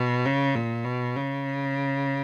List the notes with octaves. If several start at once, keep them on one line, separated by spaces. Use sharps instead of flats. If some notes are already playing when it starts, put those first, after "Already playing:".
Already playing: B2
C#3
A#2
B2
C#3